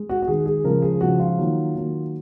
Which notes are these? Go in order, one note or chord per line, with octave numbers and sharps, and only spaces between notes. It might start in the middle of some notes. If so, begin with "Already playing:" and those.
Already playing: G#3
F#4
F#4
D#3 G#3 G#4
G#4
C#3 F3 G#3 A#4
G#4
C#3 F3 G#3 F#4
F4
D#3 F#3 A#3
D#3 F#3 A#3